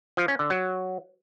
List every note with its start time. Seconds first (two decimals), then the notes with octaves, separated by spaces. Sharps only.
0.17 F3
0.28 C#4
0.39 D3
0.50 F#3